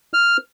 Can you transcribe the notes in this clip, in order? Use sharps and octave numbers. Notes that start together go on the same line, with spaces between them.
F6